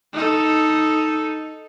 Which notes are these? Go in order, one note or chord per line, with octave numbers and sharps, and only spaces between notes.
D#4 A4